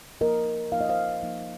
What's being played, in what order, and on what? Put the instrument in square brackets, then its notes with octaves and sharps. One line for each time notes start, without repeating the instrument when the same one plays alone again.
[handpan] F3 A#3 D#4 A#4 D#5
F3 A#3 D#4 F5
D#5
C5 F5
F3 A#3 D#4